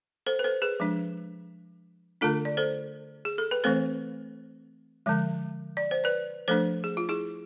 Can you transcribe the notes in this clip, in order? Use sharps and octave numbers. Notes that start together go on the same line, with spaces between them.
A4 C5
B4
A4 C5
G#4 B4
F3 G#3 D4
D3 A3 D4 F4 A4
D5
A4 C5
G#4
A4
B4
E3 A3 C4 A4 C5
D3 F3 G#3
D5
C5
B4 D5
F3 A3 D4 A4 C5
G#4
F4
E4 G#4